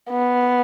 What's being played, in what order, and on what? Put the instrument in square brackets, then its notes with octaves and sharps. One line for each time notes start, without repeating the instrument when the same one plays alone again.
[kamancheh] B3